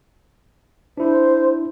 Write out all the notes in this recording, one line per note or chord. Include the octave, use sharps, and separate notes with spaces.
D4 E4 C5